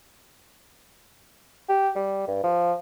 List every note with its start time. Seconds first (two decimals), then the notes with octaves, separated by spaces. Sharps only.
1.69 G4
1.96 G3
2.28 G2
2.44 F3